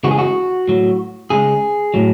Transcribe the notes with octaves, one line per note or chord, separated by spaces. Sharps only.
C#3 E3 G#3 F#4
G#4
F#4
A2 F#3
C#3 G#3 G#4
A2 F#3